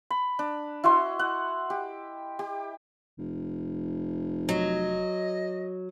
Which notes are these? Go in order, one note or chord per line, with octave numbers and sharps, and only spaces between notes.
B5
D4
E4 F#4 D#5 C6
F#5
G4
G4
F1
F#3 D#5